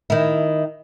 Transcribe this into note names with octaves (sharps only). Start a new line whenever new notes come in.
D#3 E4